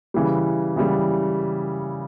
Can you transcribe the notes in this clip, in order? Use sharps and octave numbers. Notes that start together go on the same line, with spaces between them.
C#3 E3 G3
C#3 E3 G3